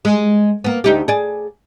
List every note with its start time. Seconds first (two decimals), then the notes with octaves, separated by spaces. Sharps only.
0.05 G#3
0.64 A#3 B3
0.84 D2 D#4 G4
1.08 G#4 D5